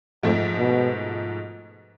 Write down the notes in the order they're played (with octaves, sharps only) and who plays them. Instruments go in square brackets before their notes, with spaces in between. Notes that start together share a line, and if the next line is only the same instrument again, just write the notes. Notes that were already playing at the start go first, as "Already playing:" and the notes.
[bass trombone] F2 [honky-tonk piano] G#2 F3 A3
[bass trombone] B2